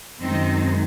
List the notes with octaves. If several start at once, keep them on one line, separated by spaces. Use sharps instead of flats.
F#2 D#3 G#3 C4 D#4